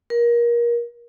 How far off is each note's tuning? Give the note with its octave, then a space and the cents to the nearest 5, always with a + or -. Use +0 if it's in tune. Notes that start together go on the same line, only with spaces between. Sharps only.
A#4 +25